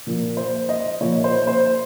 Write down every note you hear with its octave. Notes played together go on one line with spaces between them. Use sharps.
A#2 F3 A#3
C5
D#5
A#2 F3 A#3 C#5
C5
C5